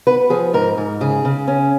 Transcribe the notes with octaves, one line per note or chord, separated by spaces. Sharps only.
B3 B4
F3 G#4
G#2 A#4
G#2
C#3 G#4
C#3
C#4